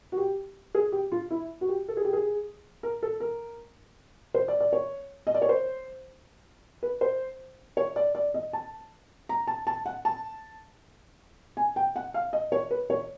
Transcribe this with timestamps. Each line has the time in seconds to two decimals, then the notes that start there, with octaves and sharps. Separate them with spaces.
0.12 F#4
0.18 G4
0.75 G#4
0.92 G4
1.12 F4
1.30 E4
1.61 F#4
1.68 G4
1.88 A4
1.97 G#4
2.05 G4
2.13 G#4
2.83 A#4
3.03 A4
3.20 A#4
4.34 C5
4.48 D5
4.60 D5
4.73 C#5
5.27 D#5
5.34 D5
5.42 C#5
5.49 C5
6.83 B4
7.01 C5
7.77 C#5
7.96 D5
8.15 D5
8.34 D#5
8.53 A5
9.29 A#5
9.47 A5
9.67 A5
9.86 F#5
10.05 A5
11.57 G#5
11.76 G5
11.96 F#5
12.14 F5
12.33 D#5
12.52 C#5
12.71 B4
12.90 C#5